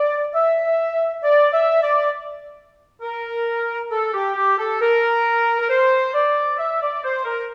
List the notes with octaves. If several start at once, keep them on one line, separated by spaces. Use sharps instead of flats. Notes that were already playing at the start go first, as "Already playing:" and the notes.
Already playing: D5
E5
D5
E5
D5
A#4
A4
G4
G4
A4
A#4
A#4
C5
D5
E5
D5
C5
A#4